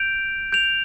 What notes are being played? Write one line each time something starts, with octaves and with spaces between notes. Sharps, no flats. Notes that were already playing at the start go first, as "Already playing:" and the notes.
Already playing: G6 D7 F7
G6 D7 F7